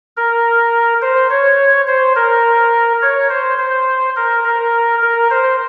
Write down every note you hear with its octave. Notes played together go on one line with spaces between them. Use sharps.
A#4
C5
C#5
C5
A#4
C#5
C5
C5
A#4
A#4
A#4
C5